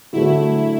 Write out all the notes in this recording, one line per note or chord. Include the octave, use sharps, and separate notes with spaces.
D3 F#3 A3 E4